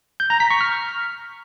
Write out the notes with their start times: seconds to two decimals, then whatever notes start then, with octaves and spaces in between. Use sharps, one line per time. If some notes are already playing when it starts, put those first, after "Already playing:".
0.20 G6
0.30 A#5
0.40 B6
0.50 C#6
0.61 F6